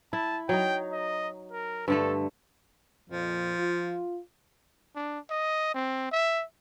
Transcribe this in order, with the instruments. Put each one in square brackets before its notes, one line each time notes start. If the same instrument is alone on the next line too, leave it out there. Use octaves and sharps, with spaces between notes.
[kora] E4 [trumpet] A5
[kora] F#3 D#4 [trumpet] G5
[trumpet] D#5
A#4
[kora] G2 D3 A3 [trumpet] A4
[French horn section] F2 A#2 [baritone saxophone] F3
[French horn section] F4
[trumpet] D4
D#5
C4
E5